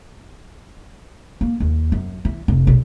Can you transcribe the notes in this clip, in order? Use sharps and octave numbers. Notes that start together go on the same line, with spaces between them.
A#3
D#2
F#2
E3
F1
B1